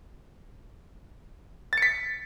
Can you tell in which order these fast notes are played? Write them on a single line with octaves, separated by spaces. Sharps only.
A6 C#7 B6